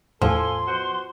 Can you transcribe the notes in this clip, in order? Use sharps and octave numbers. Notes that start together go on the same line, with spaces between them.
E2 A2 F3 A4 G#5 C6
B2 F#4 C5